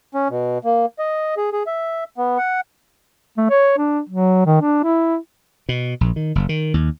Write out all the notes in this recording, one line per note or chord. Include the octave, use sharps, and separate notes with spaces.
C#4
B2
A#3
D#5
G#4
G#4
E5
B3
F#5
A3
C#5
D4
F#3
D#3
D4
E4
B2
A#1
D#3
F#1
D#3
D#2